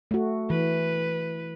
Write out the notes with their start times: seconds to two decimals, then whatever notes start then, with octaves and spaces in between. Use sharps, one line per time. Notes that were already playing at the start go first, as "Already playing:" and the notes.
0.11 A3 F#4
0.50 E3 B4